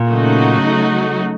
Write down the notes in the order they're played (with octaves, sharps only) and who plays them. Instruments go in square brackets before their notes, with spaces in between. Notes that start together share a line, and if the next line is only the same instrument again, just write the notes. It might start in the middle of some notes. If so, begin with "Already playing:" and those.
Already playing: [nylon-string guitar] A#2
[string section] C#3 F#3 A3 D#4 F#4